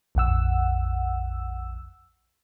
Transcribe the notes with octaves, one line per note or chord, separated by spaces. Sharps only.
A#1 F2 F#5 E6